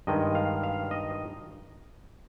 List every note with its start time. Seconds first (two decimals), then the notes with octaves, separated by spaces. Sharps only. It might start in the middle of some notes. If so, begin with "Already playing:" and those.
0.07 G2 D#3 G#3 D#5
0.35 F5
0.63 F5
0.91 D#5